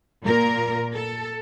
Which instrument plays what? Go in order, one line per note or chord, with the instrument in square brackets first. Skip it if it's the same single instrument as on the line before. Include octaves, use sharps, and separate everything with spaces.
[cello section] A#2 A#3 A#4
A4